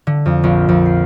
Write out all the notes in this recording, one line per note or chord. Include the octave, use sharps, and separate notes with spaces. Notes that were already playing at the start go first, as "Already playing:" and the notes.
D3
F2
A#1
F2
C7